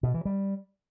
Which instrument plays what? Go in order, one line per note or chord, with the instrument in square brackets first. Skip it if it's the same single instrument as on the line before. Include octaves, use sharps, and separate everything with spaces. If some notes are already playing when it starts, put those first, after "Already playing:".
[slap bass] B2
E3
G3